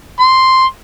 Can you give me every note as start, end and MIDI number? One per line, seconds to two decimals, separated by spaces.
0.20 0.64 84